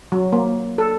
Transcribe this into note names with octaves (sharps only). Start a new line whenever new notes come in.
F#3
A#3
A4